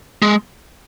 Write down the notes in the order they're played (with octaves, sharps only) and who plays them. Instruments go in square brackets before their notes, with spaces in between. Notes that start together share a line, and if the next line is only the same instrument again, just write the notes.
[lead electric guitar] G#3